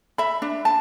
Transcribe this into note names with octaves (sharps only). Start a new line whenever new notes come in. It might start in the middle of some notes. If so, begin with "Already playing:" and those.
E5 B5
D4
A5